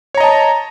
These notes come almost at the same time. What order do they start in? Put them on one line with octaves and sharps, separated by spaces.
C#5 A#5 D#5 A5